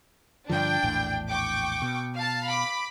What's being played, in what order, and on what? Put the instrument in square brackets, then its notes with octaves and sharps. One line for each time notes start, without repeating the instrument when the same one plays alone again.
[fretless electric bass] G2 D3 F3 [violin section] D4 G5
[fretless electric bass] A#1 E2 A2
[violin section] G5 C#6 D6
[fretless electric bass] B2
[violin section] F5 A5
B5 D6